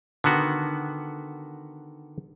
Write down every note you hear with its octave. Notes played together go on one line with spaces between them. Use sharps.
D3 D#3 B3 F#4